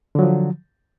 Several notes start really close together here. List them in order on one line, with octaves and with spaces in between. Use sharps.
D3 F#3 F3